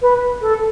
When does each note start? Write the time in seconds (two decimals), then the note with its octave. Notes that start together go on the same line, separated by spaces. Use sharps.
0.02 B4
0.41 A4